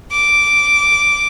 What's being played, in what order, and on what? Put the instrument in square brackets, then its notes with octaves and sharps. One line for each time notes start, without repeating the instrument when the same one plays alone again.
[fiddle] D6